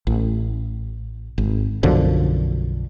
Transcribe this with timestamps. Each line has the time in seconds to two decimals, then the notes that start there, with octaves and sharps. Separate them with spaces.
0.07 A1
1.38 G#1
1.83 B1 F#2 D3 F3